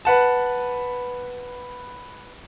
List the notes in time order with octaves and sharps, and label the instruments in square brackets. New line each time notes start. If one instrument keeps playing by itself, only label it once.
[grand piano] B4 F#5 A5